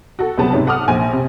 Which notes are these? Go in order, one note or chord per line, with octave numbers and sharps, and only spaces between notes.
F#4 A4
C2 C#3 F#3 B3 A5
G#2 C3 C#4 D#4
A4 F#5 A5 D6 D#6 F6
A#1 G#5
C3